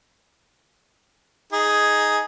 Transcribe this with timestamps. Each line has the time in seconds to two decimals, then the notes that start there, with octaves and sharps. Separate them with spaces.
1.52 D#4 G#4